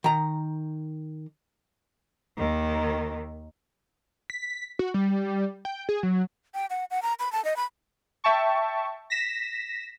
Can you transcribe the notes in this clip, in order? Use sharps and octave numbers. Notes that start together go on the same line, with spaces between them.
D#3 A#5
D#2 D#3
B6
F#4
G3
G5
G#4
F#3
G5
F#5
F#5
A#5
B5
A5
D#5
B5
E5 G5 A5 C#6
A#6 B6 E7